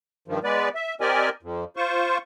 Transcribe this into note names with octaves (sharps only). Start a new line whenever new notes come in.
G2 D#3 F3
G#3 B3 B4 D5
E5
C4 G4 A#4 D5 D#5 G#5
F2
F4 C5 C#6